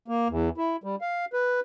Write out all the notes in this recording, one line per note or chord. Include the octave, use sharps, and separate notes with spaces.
A#3
E2
E4
G3
F5
B4